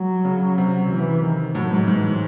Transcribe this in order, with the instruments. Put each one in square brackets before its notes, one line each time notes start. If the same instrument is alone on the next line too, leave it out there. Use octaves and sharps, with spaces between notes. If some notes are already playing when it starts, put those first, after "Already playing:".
Already playing: [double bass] F#3
[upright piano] C#3
C3
[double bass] E3
D#3
[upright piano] A2 [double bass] F#3
[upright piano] G#2
[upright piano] G#2 [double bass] E3